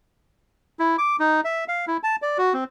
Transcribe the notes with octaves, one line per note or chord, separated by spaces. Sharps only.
E4
D6
D#4
E5
F5
E4
A5
D5
F#4
C4